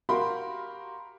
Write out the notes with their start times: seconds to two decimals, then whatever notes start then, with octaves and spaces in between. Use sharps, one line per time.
0.09 F#4 G4 A#4 F5 B5 C6